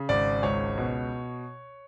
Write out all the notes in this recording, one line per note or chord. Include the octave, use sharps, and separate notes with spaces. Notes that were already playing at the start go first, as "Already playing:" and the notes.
Already playing: C#3
G#1 D5
C#2 C#5
B2